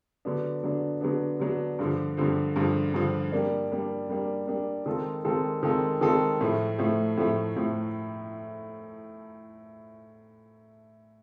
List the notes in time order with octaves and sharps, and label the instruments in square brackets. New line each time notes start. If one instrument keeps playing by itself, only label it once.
[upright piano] D3 F#3 B3 D4
D3 F#3 B3 D4
D3 F#3 B3 D4
D3 F#3 B3 D4
G2 D3 F3
G2 D3 F3
G2 D3 F3
G2 D3 F3
G3 A#3 D4
G3 A#3 D4
G3 A#3 D4
G3 A#3 D4
D#3 G#3 C4 F4 A4
D#3 G#3 C4 F4 A4
D#3 G#3 C4 F4 A4
D#3 G#3 C4 F4 A4
A2 F3 A3
A2 F3 A3
A2 F3 A3
A2 F3 A3